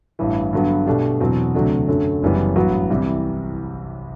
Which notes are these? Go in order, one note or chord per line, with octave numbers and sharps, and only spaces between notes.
A1 G2 E3
G2 D3 F#3 B3
B2 A3 D4 G4
E2 B2 F#3 C4
D2 C3 F#3 A3 D4
F#2 D3 F#3 A3
F#1 F#2 E3 G3 B3
A1 G2 F#3 B3 F#4
C2 C3 E3 G3